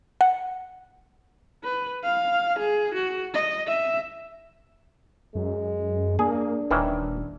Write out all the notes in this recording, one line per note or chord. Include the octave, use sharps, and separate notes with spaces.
F#5
B4
F5
G#4
F#4
D#5
E5
F#2 G#3
A#3 D4 G#4
D#1 D#3 E3 C#4